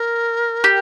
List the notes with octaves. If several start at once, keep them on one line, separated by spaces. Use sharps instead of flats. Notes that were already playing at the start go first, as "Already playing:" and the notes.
Already playing: A#4
G4